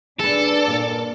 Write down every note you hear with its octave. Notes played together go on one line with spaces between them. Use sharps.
D4 G#4 A4 B4 D5
A#2 A#4